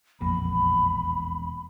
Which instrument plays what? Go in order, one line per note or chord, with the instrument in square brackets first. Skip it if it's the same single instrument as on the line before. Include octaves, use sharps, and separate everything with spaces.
[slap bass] E1 A#3 [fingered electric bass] A#1 F2 [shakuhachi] B5